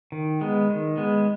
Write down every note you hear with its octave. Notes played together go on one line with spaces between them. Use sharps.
D#3
G#3 B3
D#3
G#3 B3